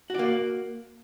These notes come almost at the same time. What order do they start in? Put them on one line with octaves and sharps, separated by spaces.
F#4 D5 A#3